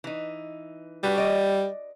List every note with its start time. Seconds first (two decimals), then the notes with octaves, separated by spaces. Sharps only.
0.04 E3 D#4
1.04 G3 D4 F#4 B4
1.18 D5 D#5